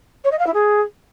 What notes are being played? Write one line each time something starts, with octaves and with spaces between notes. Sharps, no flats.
C#5
D#5
F5
E4
G#4